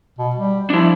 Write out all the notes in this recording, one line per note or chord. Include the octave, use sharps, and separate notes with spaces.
B2
G3
F3 D4 E4